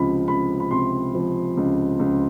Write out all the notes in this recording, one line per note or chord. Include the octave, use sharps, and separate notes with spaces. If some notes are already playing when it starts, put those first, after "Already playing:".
Already playing: C#2 C3 F3 B5
C#2 B5
B5
C3 C6
F3
C#2
C#2